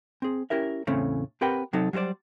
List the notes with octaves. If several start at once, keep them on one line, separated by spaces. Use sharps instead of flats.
C4 G#4
C#4 E4 G4 A#4 E5
E2 A2 C#3 A3 C4 C#4
C4 G4 A#4 B4 F#5 G5
C3 F#3 C4 D#4 A4
F#3 G3 F#4 C5 D5